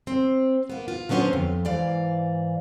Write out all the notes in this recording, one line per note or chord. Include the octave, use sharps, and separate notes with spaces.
C4
A#3 B3
F4
D3 F#3 B3 C#4 C5
F2
G#2 E3 D5 F5